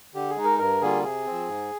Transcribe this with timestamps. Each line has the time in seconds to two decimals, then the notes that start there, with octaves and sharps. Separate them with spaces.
0.14 D3 G4
0.30 G#4
0.36 G#3 D#4
0.44 A#4
0.59 G2 A#4
0.81 D3 G3 A#3 F4 G#4
1.03 C3 G#4
1.26 F3 C4
1.48 G#2